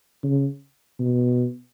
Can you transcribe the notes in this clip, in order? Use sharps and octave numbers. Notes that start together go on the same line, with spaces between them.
C#3
B2